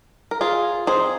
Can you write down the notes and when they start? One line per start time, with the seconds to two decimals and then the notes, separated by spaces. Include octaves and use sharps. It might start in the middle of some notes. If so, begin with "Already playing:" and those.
0.31 A#4
0.41 F4 G#4
0.87 F3 C4 D#4 G#4 C5